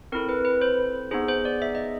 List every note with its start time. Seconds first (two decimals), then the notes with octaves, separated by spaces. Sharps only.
0.12 C4 E4 A4 A#4
0.29 B4
0.45 B4
0.61 C5
1.11 B3 D#4 G#4 C5
1.28 C5
1.45 D5
1.62 E5
1.75 D#5